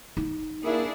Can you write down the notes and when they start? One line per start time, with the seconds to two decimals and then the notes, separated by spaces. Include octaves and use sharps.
0.17 D#4
0.63 A#3 D4 E4 G#4